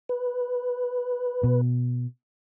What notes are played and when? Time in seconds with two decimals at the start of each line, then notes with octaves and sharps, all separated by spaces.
0.09 B4
1.43 B2